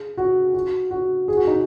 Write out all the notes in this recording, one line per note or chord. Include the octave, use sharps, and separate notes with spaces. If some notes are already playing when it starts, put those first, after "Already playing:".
Already playing: G#4
F#4
F#4
F#4
G#4
F#4
D#4